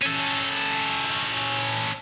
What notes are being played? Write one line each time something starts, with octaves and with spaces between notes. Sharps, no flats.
C#4 A4